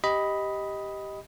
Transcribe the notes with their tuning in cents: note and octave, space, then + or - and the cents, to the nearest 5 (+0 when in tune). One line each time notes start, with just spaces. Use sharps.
G4 +0 D#5 +10 B5 +0